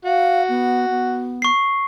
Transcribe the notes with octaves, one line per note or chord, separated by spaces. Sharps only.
F#4 F5
B3
B3
C#6 C7